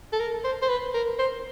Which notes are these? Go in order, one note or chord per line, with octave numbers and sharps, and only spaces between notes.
A4
A#4
C5
C5
B4
A#4
C5